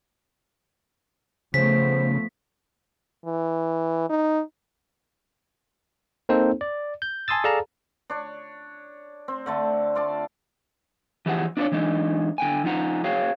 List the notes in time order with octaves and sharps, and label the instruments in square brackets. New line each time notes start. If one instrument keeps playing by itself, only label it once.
[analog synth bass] C#3 [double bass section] F3 A3 B3 [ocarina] C5 [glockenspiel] B6
[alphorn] E3
D#4
[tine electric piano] A#3 C4 D#4 A4 C5
D5
G6
G#5 A5 C6 D#6 E6 A6
G#4 A4 D5 F5 A5 A#5
[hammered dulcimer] D4 C#5
C4
D3 A3 A5
F4 D5 A5
[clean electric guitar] E3 F3 E4 G4 G#4 F#5
D4 F4 G#4 B4 C#5 D5
E3 G#3 D4 D#4
D3 G5 G#5
F3 D#4 F4 F#5 A#5
F#4 G#4 C#5 F5 G5